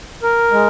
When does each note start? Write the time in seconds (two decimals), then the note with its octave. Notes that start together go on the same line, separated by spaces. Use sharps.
0.23 A#4
0.51 G#3